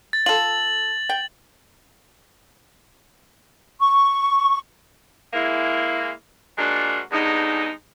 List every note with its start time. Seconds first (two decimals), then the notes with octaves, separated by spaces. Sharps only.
0.13 A6
0.26 F4 A4 F#7
1.09 G5
3.81 C#6
5.33 G#3 A#3 E4
6.58 F3 F#3 G#3 A#3 D4 F#4
7.12 E2 G2 D3 G#3 D#4